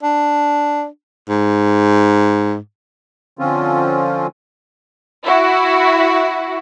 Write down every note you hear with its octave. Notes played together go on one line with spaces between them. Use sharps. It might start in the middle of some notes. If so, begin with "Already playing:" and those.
D4
G#2
D3 F3 C4 C#4 F4
E4 F#4